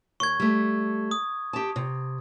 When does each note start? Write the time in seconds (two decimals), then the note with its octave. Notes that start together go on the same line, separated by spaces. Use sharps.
0.20 D#2 C#6 G#6
0.40 G3 A3
1.11 D#6
1.53 G4 A5
1.76 C3